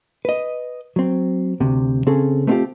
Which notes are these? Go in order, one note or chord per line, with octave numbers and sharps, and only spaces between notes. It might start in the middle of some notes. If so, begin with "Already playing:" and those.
B4 D#5
F#3 C4
D2 C3
C#3 C4 C#4 G#4 A4
A3 B3 C4 D4 F4 G4